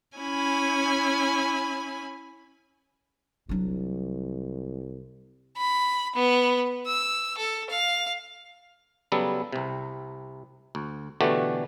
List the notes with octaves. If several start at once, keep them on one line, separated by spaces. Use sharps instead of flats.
C#4 E4 G#5 B5
C2 F#3 D4
B5
B3
E6
A4
F5
C#3 F#3 G3 B3 A4
C2 C3
D2
B2 D3 E3 A3 F#4 G4